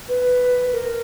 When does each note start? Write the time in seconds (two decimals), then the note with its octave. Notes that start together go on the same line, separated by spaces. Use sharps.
0.09 B4
0.73 A#4